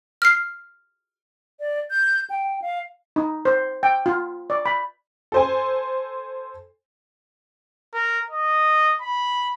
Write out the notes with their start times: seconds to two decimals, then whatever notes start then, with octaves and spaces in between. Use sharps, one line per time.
0.22 F6 C7
1.60 D5
1.91 G6
2.30 G5
2.62 F5
3.16 D#4
3.45 C5
3.83 G5
4.06 F4
4.50 D5
4.66 B5
5.32 A4 C5 G#5
7.93 A#4
8.31 D#5
9.01 B5